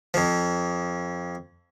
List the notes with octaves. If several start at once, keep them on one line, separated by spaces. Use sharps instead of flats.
F2 F3